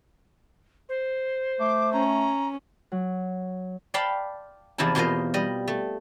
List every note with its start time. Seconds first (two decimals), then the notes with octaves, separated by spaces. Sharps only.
0.89 C5
1.60 A3 D6
1.93 C#4 A#5
2.92 F#3
3.94 D5 F5 G5 A5 B5 C6
4.78 E2 C3 F3 D#4 E4 A5
4.95 E2 B2 A#3 F4 C5 D#5
5.34 G3 D#5
5.68 A3